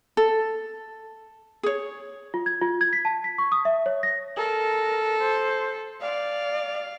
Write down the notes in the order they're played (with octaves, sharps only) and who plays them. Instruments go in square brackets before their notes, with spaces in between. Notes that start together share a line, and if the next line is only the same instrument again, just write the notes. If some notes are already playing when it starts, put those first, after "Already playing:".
[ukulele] A4
G#4 C#5
[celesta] F4
G#6
F4
G#6
B6
A5
B6
C#6
D#6
E5
C#5
A#6
[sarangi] A4 [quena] A#4
[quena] C5
[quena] D5 [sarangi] F5